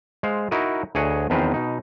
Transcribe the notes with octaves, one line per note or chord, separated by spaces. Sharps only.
G#3 C5 F5
D#4 E4 F#4 A#4 D#5
D2 G#4 C#5 D#5 F#5
E2 D#3 F3 C4 B4 F5
B2 D#4